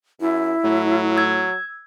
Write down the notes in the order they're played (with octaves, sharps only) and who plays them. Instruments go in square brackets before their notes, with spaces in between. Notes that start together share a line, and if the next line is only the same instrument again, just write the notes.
[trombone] F#2 [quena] E4
[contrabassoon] A2 [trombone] F#3
[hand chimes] E6 G#6